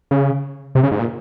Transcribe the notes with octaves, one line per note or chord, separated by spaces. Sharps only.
C#3
C3
C#3
G#2
A#2